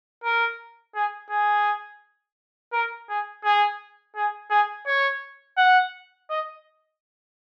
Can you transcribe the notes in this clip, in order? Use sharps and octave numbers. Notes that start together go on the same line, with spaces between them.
A#4
G#4
G#4
A#4
G#4
G#4
G#4
G#4
C#5
F#5
D#5